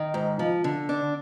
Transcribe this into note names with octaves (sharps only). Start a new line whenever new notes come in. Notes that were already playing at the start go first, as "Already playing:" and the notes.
Already playing: D#3
G#2
F3
D3
D4